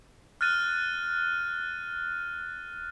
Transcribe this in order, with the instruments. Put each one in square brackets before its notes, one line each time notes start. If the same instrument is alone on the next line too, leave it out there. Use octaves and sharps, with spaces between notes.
[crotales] F6 F#6 A6 D#7